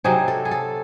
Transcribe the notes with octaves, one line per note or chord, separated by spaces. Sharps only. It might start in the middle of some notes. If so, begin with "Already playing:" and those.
C3 F#3 C4 D#4 G#4
A4
G#4
A4